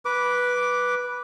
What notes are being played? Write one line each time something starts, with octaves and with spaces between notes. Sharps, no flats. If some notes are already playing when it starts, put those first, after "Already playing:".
B4 D6